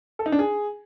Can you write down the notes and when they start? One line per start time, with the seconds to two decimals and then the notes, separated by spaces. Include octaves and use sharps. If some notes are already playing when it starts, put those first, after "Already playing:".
0.19 A4
0.26 D#4
0.32 D4
0.39 G#4